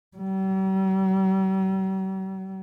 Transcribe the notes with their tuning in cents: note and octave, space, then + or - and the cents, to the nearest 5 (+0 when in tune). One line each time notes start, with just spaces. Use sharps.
G3 -45